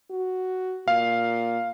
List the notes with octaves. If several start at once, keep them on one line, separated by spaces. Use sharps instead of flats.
F#4
A#2 F5